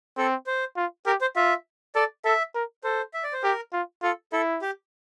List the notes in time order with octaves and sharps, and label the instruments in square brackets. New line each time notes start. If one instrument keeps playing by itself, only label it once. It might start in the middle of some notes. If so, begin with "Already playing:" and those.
[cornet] C4 [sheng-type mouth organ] A4
[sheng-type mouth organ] C5
[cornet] F4
[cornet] G4 [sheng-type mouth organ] A#4
[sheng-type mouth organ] C5
[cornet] F4 [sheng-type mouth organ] E5
[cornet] A4 [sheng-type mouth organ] D5
[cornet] A4 [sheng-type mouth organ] E5
[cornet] A#4
[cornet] A4 [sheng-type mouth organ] C5
[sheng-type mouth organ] E5
D5
C5
[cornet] G4 [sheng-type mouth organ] A#4
[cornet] F4
[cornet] F4 [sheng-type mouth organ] A4
[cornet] E4 [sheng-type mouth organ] A4
[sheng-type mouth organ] G4